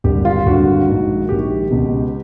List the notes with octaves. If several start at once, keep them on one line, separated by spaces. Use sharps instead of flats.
G#1 G2 D3 G4
F4
G#1 G2 D3 F#4
A#1 G#2 D#3
A#1 G#2 D#3 G4
C#2 B2